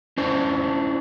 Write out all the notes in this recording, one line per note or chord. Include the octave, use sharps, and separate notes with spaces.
C#4 D4 E4 C5